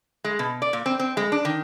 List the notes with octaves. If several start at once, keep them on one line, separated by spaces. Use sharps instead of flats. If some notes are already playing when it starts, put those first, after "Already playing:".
G#3
B2
D5
A#2
C4
C4
G#3
D4
D#3